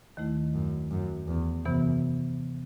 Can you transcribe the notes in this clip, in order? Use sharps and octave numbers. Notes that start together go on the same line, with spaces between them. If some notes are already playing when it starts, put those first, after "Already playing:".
D#2 D#3 A3 E4
F#2
F#2
E2
F#2 C3 E3 B3